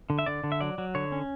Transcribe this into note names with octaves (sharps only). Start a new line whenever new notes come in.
D3
E5
D3 D5
D3
E5
F#3 D5
F#3
D3 C#5
C#4